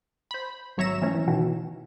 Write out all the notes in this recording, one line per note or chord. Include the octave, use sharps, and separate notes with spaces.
C5 B5
G#1 F#3 C#5 E5 A#5 E7
E3 F3 A3 C#4
E3
B2 D#3 E3